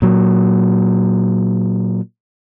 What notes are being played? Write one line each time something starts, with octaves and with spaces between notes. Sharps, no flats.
A#2 F#3